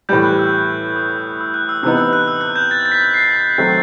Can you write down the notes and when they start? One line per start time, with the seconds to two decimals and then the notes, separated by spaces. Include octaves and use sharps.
0.09 A2 E3 G3 G6
0.23 F#6
0.39 E6
0.96 D#6
1.40 E6
1.54 F#6
1.69 E6
1.83 C3 E3 B3 D#4 E6
1.98 E6
2.13 F#6
2.28 E6
2.41 F#6
2.56 G6
2.71 A6
2.86 A6
2.92 B6
3.14 C7
3.58 D#3 F#3 A3 C4 B6